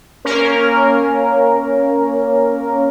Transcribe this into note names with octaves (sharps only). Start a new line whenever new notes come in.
A#3 C#4 A#4